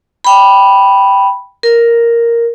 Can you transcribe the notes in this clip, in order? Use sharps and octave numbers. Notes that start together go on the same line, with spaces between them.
G5 B5
A#4